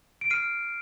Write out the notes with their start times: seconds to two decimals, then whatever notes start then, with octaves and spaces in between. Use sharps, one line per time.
0.21 D7
0.30 F6 C7 D#7